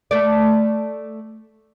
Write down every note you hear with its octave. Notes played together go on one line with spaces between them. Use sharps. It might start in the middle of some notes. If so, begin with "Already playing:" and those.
A3 D5